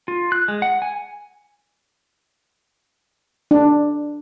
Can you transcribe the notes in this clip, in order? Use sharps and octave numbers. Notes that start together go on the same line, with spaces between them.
F4
F#6
G#3
F#5
G#5
D4